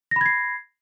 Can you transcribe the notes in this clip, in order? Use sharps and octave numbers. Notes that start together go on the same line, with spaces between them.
B5 G#6 A#6 C7